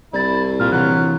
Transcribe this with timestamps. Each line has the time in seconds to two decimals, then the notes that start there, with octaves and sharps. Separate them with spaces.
0.13 C2 E4 D5 A6
0.60 F2 A#2 F4 F6
0.72 C3 E3 F#3 F#6